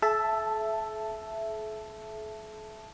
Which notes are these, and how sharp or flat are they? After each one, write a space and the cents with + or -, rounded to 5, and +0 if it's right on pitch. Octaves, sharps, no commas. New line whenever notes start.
A4 -45 E5 +10 A5 +0